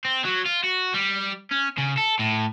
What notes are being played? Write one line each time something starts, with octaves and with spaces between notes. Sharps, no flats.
C4
F#3
F4
F#4
G3
C#4
C#3
A4
A2